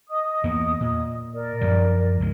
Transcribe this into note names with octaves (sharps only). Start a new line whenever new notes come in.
D#5 D#6
E2 A#3 B3
A#2
A#4 D5
F#2 F3 G3
C#2 G2 G#3